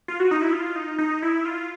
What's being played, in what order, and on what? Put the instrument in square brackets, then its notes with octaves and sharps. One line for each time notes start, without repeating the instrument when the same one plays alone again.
[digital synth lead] F4
F#4
D#4
E4
F4
D#4
D#4
E4
F4